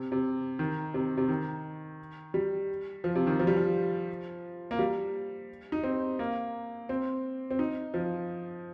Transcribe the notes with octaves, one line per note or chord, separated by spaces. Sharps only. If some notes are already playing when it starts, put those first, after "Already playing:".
Already playing: C3
C3
D#3
C3
C3
D#3
G3
F3
C3
D#3
F3
G3
F3
A#3
G3
D#4
C4
A#3
C4
C4
D#4
F3